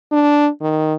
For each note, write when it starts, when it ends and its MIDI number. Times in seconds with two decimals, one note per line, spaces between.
0.12 0.49 62
0.61 0.94 51